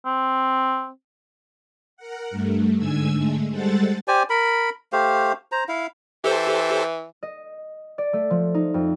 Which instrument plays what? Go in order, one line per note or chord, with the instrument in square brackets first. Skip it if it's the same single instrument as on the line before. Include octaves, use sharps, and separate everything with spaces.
[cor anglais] C4
[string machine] A#4 F#5
G2 A3
G#2 D3 G#5 E6 G#6
D3 G#3 A3
G3 G#3 A4 C5 F#5 A6
[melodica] G4 C5 D5 G#5
A#4 B5
A3 G4 C5 F5
C5 A#5
E4 F5
[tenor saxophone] E3 [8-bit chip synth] G4 A4 C5
[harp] D#5
D5
A3
F3
D#4
F2